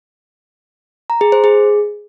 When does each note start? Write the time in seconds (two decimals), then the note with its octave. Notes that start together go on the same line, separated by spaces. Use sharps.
1.10 A#5
1.21 G#4
1.32 C5
1.44 G#4